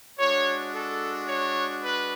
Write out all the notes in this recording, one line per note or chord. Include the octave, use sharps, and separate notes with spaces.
G#3 D4 F#4 C#5
A4
C#5
B4